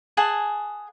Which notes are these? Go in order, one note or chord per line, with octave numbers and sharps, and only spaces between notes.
G#4 F#5 G#5 A5